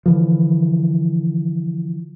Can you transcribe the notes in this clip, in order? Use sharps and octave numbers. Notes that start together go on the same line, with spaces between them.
D3 E3 F3